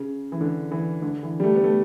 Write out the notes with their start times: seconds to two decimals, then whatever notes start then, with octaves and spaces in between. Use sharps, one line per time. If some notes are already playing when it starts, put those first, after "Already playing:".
Already playing: C#3
0.32 E3
0.41 D3
0.72 E3
1.02 D3
1.23 E3
1.40 G3
1.44 A3
1.55 B3
1.64 A3